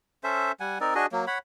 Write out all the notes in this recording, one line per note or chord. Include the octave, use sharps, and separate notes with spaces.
C#4 A4 C5 E5
G3 F#5 G#5
C4 D#4 A#4 D5
D4 F#4 G#4 D#5
F#3 A#3
C#5 F#5 B5